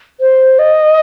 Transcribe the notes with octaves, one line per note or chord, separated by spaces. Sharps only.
C5
D#5